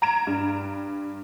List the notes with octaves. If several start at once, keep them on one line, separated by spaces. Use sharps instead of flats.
A#5 G#6 D7 E7
G2